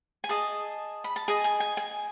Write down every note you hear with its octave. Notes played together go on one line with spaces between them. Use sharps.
G#5
G#4 D#5 A5
B5
A5
G#4 D#5 G#5
G#5
G#5
G#5